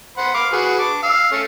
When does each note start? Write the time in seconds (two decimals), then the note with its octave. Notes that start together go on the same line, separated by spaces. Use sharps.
0.17 C5 F#5 B5
0.34 F5 D6
0.52 F#4 G#4 B4
0.79 A5 D6
1.03 F5 E6
1.31 A3 C#4